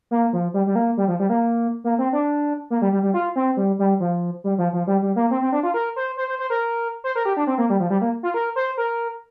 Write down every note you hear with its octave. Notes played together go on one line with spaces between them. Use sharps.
A#3
F3
G3
G3
A#3
G3
F3
G3
A#3
A#3
C4
D4
A#3
G3
G3
G3
F4
C4
G3
G3
F3
G3
F3
F3
G3
G3
A#3
C4
C4
D4
F4
A#4
C5
C5
C5
C5
A#4
C5
A#4
G4
D4
C4
A#3
G3
F3
G3
A#3
F4
A#4
C5
A#4